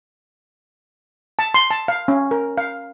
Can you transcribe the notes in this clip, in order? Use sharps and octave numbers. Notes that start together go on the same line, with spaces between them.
A5
C6
A5
F5
C#4
A#4
F5